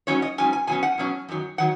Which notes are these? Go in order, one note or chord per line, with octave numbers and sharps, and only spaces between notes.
G#2 F#3 C#4 C#5
D#5
G#2 F#3 C#4 G#5
G#5
B2 F#3 C#4 G#5
F#5
B2 F#3 C#4
F#2 D#3 F#3
D#3 F#3 F#5